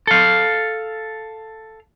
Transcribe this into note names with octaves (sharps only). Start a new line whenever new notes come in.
A4 F5